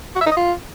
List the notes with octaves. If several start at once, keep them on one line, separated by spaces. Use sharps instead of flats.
F#4
E5
D#4
D#5
F4